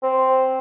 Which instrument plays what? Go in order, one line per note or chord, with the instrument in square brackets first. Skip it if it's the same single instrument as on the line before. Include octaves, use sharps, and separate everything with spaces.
[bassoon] C4